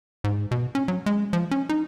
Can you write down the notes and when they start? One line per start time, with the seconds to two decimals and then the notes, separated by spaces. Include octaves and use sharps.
0.24 G#2
0.51 B2
0.75 C#4
0.88 F#3
1.06 G#3
1.33 F3
1.51 C#4
1.69 D#4